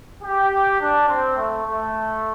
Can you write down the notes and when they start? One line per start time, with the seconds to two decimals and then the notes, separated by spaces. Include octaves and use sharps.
0.23 G4
0.80 D4
1.08 C4
1.36 A3
1.65 A3